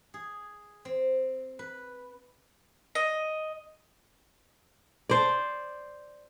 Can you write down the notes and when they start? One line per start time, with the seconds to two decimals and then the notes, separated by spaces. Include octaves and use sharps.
0.14 G#4
0.85 C4
1.59 B4
2.95 D#5
5.09 C5 D5